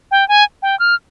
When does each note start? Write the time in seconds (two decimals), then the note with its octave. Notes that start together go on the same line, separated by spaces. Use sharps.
0.11 G5
0.28 G#5
0.62 G5
0.80 F6